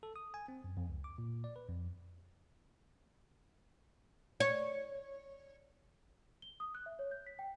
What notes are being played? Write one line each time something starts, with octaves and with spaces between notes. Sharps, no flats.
A4
D#6
G#5
C4
F#2
F2
C#2
D6
A#2
D5
B4
F2
C#5
G7
D#6
F#6
E5
C#5
G6
B6
G5